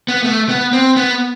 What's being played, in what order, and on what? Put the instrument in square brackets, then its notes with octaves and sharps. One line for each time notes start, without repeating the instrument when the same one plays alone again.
[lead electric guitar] B3
A3
B3
C4
B3